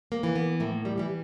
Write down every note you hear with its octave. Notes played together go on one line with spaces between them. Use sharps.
A#3
E3
B3
A2 A#3
G3
E3 G3